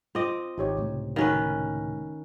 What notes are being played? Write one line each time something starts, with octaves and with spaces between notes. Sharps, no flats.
C4 F4 D#5 D6
G#1 D#4 G4 C#5
C#2 A2 C3
D#3 C#4 F#4 A#4 B4 F5